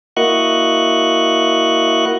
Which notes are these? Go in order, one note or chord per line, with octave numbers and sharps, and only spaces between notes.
A#3 E4 F#4 D#5 C#6 F#6